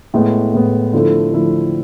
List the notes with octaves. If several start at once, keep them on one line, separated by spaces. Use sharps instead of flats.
A2 G#3 B3
A2 G#3 B3
D3 F3 A3 E4
D3 F3 A3 E4